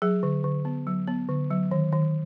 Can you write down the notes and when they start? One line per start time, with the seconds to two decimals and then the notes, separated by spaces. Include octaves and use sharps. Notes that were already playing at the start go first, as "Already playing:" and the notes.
0.02 F#3 G#4
0.23 D3
0.44 D3
0.65 B3
0.87 F#3
1.07 B3
1.29 D3
1.51 F#3
1.71 D#3
1.92 D#3